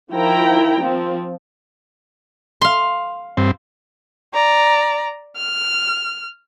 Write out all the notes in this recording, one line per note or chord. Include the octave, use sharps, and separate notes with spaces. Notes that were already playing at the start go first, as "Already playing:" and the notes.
D#3 F3 E4 G5 A#5
F3 C4
F5 C6
G2 C4
D5 A#5
F6